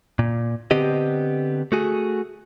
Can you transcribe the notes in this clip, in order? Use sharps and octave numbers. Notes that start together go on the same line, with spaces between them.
A#2
D3 B3 C4 G4 D#5
A3 F#4 G#4